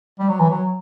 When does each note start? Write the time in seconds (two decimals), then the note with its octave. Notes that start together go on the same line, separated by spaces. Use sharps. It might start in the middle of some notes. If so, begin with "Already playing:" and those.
0.19 G3
0.29 F#3
0.40 E3
0.50 F#3